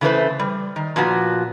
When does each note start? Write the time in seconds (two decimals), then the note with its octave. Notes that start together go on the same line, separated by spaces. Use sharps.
0.01 C#3 E3 A3 E4 B4 C5
0.39 G3
0.76 D#3
0.96 A#2 F3 B3 F#4